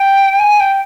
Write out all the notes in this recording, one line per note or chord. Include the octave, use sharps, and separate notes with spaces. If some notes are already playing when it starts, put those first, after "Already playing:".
Already playing: G5
G#5
G5